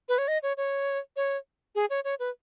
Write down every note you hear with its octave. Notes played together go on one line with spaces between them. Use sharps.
B4
C#5
D#5
C#5
C#5
C#5
G#4
C#5
C#5
B4